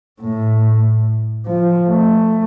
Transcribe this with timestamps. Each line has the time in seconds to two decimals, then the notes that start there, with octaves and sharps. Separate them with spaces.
0.21 A2
1.46 F3
1.88 A3